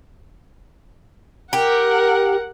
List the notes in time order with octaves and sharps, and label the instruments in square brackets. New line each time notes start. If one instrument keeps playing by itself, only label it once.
[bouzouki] G4 [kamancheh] A#4 F#5